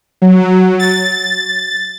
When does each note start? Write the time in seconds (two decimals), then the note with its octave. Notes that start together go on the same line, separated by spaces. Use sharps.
0.22 F#3
0.79 A6